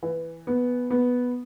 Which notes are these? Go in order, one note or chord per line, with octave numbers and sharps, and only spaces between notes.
E3
B3
B3